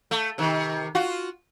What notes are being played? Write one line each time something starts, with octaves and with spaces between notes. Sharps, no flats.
A3
C3 D#3
F4 F#4